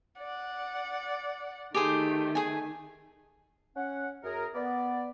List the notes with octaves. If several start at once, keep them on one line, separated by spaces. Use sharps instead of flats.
D5 F#5
D#3 A3 G4 G#4 C5
G#4 G#5
C#4 F#5
F#2 G#4 A#4
B3 D5